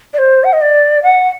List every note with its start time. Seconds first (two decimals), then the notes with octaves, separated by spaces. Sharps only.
0.13 D5
0.18 C5
0.44 F#5
0.53 D#5
0.61 D5
1.03 F#5